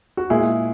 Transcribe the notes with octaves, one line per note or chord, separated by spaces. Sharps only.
F#4
A#2 G#3 E4 G#4